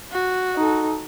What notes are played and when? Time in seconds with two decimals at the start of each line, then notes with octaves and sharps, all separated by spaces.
0.12 F#4
0.56 D#4 A4